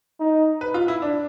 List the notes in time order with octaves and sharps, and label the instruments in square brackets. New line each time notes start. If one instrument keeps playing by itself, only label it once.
[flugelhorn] D#4
[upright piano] B4
F4
E4
D4